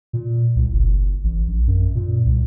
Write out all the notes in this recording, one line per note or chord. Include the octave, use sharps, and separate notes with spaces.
A#2
C2
F#1
A1
A#1
F#2
A#2
C2